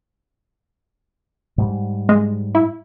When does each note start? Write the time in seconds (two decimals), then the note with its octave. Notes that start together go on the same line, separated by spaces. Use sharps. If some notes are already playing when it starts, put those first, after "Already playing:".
1.58 G#2 G3
2.09 G#3
2.55 E4